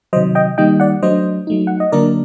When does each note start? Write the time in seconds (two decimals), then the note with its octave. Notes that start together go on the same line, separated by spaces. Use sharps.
0.13 C3 D#3 F#3 C5 D#5
0.35 D#5 G5
0.58 D#3 G3 A#3 D#4 D#5 G5
0.80 D5 F#5
1.02 F#3 A3 D4 C5 D#5
1.47 F#3 A3 D#4
1.67 F#5
1.80 D#5
1.92 D3 F#3 A#3 D4 A#4 D5